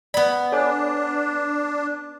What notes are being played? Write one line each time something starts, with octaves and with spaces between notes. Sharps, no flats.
B3 D5 B5
D4 A4 C#5 G#5